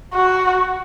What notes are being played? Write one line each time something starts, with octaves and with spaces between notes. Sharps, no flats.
F#4